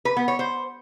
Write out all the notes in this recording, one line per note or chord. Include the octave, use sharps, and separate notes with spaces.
B4
B3
C#5
C5